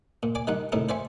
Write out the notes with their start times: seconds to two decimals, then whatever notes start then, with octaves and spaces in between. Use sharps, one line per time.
0.23 A#2
0.35 D5 G#5 D6
0.47 D#3 G3 D#4 F#5
0.72 A2 C3 D#3 D#4 E4
0.89 C5 D5 E5 G#5 C#6